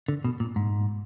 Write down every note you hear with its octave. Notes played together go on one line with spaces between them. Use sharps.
D3
B2
A#2
G#2